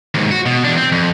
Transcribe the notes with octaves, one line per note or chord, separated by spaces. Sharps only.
D#2 G#2
F#4
B2
E2 D4
C4
F2